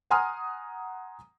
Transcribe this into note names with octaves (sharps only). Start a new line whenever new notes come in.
F#5 G#5 A#5 C6 D#6 F6